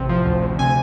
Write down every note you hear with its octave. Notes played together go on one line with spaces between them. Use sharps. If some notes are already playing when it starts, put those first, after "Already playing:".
Already playing: A1 C3
F3
D2
D2
C3 G#5